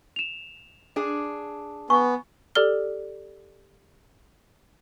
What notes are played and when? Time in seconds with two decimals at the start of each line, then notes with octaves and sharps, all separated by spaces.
0.16 E7 F7
0.96 D4 G#4
1.90 B3 G#5 C#6
2.55 G4 A4 D5 F6 G7